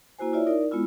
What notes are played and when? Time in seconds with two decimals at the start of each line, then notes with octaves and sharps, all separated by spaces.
0.19 A#3 E4 F#4 C5 G#5
0.33 E4 F4 C#5 D5 E5
0.47 D#4 A#4 D5
0.71 G#3 B3 E4 F4